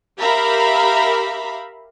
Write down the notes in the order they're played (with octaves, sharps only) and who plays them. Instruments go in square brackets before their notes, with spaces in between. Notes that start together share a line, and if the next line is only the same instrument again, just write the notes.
[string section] G4 A#4 E5 F5 A#5 B5